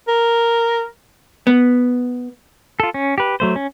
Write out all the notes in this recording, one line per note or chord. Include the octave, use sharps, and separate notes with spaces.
A#4
B3
F4 A4
C#4
G4 B4
F#3 A3 C5
C#4